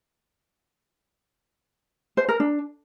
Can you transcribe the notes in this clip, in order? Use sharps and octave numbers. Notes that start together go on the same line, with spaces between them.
C5
A#4
D4